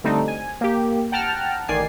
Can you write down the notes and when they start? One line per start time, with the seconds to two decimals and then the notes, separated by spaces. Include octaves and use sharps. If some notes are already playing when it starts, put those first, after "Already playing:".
0.04 D3 G3 A3 C4 D4 D#4
0.28 G#5
0.61 A#3 G4
1.12 F#5 G5 A5 A#5 F6
1.68 A1 D#3 D5 G#5 C7